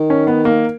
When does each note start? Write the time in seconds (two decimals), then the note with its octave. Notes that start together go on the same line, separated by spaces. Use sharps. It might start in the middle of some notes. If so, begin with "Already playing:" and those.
Already playing: D#3
0.10 C#4
0.27 B3
0.45 A#3